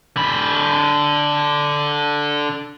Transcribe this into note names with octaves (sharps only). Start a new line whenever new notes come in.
D3 B5